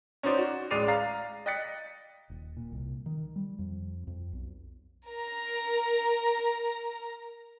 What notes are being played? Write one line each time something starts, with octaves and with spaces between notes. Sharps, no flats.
C#4 D#4 F#4 C5 D5
F#4
A1 G#3 D5 C7 D#7 F7
F5 A#5 A6 C7
D#5 G5 F#6 A6 B6 C#7
D#1
A#2
C2
D#3
G3
F2
F2
B1
A#4 A#5